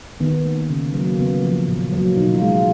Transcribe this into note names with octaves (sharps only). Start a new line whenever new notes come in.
D#3 B3
A#3
C#3
F#3 A#3
C#3 B3
F3 A#3
A#2
F#3 A#3
B2 D#4
F4
G#3
F4